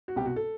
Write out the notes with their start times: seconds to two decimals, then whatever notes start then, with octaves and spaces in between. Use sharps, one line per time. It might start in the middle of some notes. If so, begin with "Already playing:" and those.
0.08 F#4
0.16 C2 B2 G4
0.25 F#4
0.36 A4